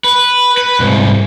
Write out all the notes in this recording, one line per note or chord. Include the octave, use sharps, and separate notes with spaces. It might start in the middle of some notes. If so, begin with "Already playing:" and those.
B4
B4
C2 G#2